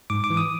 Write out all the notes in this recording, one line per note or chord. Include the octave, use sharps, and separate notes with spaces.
G#2 D6
D6
E3
D#6